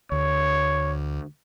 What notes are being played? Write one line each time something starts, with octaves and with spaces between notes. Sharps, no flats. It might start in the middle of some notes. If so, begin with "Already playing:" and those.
D2 C#5